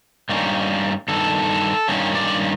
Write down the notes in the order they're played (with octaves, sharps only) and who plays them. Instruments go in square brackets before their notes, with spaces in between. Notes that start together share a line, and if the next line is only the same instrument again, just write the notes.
[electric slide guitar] G2 D#3 G3 A#3 C#4
G2 D#3 A4
G2 D#3 G3 A#3 C#4
D5